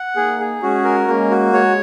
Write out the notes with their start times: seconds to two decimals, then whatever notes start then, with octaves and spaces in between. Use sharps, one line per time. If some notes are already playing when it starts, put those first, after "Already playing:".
Already playing: F#5
0.16 A#3 D#4 G#4
0.40 G#4
0.62 G#3 C#4 F#4
0.84 A#4
1.07 G#3 A#3 C#4
1.30 F#4
1.53 G#3 C#5